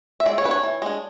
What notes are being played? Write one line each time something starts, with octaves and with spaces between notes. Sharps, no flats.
E5
G#3 D5
C#5
D4 B4
C#5
E3
G#3 D4